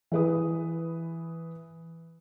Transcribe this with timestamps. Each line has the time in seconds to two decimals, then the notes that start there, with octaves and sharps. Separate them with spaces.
0.12 E3 B4 D#6